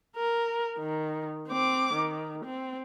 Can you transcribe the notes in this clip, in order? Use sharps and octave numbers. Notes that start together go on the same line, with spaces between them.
A#4
D#3
C4 D6
D#3
C4